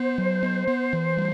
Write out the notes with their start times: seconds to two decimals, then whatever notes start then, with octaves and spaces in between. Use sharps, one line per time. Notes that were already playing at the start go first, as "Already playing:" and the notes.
Already playing: B3 C5
0.18 F#3
0.43 B3
0.67 B3
0.93 E3
1.17 G3